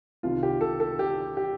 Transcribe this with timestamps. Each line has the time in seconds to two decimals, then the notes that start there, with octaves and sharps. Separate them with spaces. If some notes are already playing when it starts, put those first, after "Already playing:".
0.23 C2 C3 D#3 F4
0.43 G4
0.61 A4
0.80 A4
0.99 G4
1.37 G4